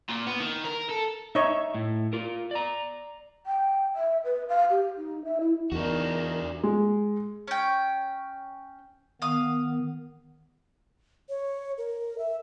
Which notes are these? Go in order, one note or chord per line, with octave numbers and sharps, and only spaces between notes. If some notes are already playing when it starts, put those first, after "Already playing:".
A#2
B3
D#3
A#4
A4
D#4 C#5 E5
A2
F4 A#4
D5 A#5
G5
E5
B4
F5
G4
D#4
E5
E4
E2 D4 D#4 F#4 A#4
G#3
C#4 G5
D#3 B3 F5 D#6
C#5
A#4
E5